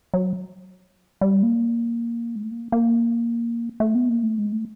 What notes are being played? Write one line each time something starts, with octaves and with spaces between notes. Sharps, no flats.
F#3
G3
A#3
G#3
A3
A#3
A#3
A3
B3
A#3
A3
G#3
A3